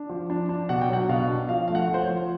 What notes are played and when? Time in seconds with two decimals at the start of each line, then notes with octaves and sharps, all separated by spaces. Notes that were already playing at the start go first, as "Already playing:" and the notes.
Already playing: D4
0.09 F3
0.30 D4
0.49 D4
0.69 B2 F#5
0.81 G5
0.89 F#3 F#5
1.09 B2 F5
1.28 D4
1.49 F3 F5
1.68 A3 F5
1.75 F#5
1.89 F3
1.94 C5
2.02 C#5
2.09 F3